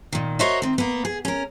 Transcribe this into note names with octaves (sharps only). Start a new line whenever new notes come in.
A#2 D#3
F#4 A#4 C5 C#5 D#5 E5
D#3 C4
A#3 B3
G#4
C#4 A#4